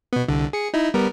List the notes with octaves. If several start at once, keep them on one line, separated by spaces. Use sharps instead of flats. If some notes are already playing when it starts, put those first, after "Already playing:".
B2 B3
C2 D3
G#4 C#7
D#4 E4
G3 B3 A#4